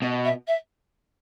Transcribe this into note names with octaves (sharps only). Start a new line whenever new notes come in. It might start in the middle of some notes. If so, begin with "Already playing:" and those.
B2 D#5
E5
E5